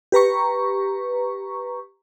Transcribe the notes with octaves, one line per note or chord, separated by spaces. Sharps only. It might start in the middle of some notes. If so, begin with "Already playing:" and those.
G4 B4 A#5 C#6